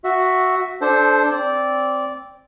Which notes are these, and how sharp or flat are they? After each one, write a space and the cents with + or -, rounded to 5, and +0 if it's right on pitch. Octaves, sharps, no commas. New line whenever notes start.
F#4 +0 E5 +0
D4 +0 A4 -25 C5 +0
C4 +5 D5 -15